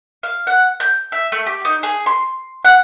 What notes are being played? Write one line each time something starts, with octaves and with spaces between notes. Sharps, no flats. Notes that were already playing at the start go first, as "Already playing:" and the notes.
F5
F#5
G6
E5
A3
G4
D#4
G#4
C6
F#5